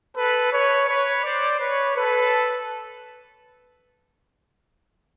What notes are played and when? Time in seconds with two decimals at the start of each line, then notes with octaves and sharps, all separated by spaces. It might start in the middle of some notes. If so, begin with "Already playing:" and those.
0.17 A4 B4
0.52 B4 C#5
0.88 B4 C#5
1.23 C5 D5
1.59 B4 C#5
1.95 A4 B4